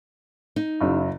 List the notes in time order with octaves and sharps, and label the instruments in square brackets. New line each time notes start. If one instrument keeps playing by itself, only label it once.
[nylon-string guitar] D#4
[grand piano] F#1 [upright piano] C#3 F#3 E4